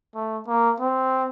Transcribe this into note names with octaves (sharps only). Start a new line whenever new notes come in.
A3
A#3
C4